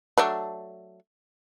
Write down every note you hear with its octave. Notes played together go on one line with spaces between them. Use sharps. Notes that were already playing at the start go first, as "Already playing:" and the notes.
F#3 A3 D4